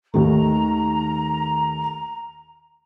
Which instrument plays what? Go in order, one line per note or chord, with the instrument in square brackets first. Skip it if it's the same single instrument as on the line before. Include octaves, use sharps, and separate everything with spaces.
[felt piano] D#2 D#3 A3 [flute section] A#5